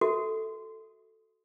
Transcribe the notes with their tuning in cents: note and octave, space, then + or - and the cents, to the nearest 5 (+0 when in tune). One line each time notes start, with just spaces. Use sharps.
F#4 +0 A4 +0 E5 -25